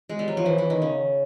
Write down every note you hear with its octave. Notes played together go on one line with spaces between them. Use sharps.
G#3
G3
F#3
F3
E3
E3
D#3
C#3